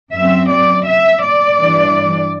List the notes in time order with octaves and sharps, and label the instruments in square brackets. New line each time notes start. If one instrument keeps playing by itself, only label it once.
[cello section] F#2 F#3 C4 E5
D5
E5
D5
G2 E3 G3 D4